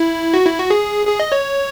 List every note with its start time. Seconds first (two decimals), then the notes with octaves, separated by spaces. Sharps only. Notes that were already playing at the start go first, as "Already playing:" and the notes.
Already playing: E4
0.34 F#4
0.46 E4
0.58 F#4
0.70 G#4
1.07 G#4
1.20 D#5
1.32 C#5